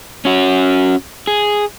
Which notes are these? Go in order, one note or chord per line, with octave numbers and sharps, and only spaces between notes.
C#4 F#4
G#4